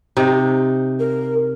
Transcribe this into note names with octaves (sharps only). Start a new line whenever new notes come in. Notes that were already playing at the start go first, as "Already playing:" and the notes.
C3 D#4
A#4